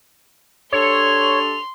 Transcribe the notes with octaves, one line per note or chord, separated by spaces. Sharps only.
D4 G4 A4 C#5 C6 F7